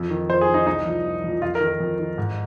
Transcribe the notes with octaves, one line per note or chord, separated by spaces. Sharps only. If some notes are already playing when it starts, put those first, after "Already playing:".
Already playing: F2
D#3
F2 C5
G#4
D#3
D#4
C2 D#4
A#2 F3
C2
A#2 F3
F2 F4
A#4
D#3
A#4
F2
D#3
G#2